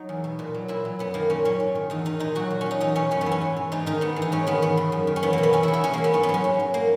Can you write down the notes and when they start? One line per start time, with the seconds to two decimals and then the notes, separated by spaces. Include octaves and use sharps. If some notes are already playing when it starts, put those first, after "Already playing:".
Already playing: F#3 D#4
0.09 E2
0.24 B2
0.39 A#2
0.54 F#3
0.68 A#2 E4
0.85 F#3
0.99 F#2 B3
1.14 D#3 A#3
1.30 A#2 C#4
1.45 F#3 C#4
1.60 G#2
1.75 D#3
1.90 E2 D#4
2.05 D#3 D#4
2.20 A#2 D#4
2.35 F#3 F#4
2.51 A#2
2.61 C#4
2.66 F#3 D#4
2.81 E2 D#4
2.95 B2 C#4
3.11 F#2 C#4
3.21 B3
3.26 E3
3.32 C#4
3.41 G#2
3.56 E3
3.72 G#2 D#4
3.86 D#3 D#4
4.01 G#2 B3
4.16 E3
4.22 D#4
4.32 G#2 C#4
4.47 D#3 B3
4.62 E2 B3
4.77 C#3
4.92 F#2
5.07 D#3
5.16 C#4
5.23 E2 B3
5.33 B2 A#3
5.43 B3
5.53 E2 C#4
5.63 C#3 E4
5.74 E4
5.84 E2 C#4
5.94 C#3 A#3
6.04 B3
6.13 G#2 C#4
6.23 B3
6.29 F#3
6.34 C#4
6.44 G#2
6.59 F#3
6.74 A#3